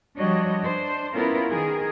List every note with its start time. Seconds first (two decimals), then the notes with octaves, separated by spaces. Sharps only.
0.18 F3 G3 D4 F#4 C#5 D#5
0.63 D4 C5
1.14 B3 C#4 E4 F4 A#4 B4
1.50 D#3 G#4 A#4